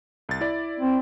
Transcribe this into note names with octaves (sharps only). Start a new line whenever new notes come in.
C2 A6
E4 D5
C4